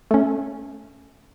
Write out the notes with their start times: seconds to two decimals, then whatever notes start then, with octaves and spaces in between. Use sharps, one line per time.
0.11 A3 C#4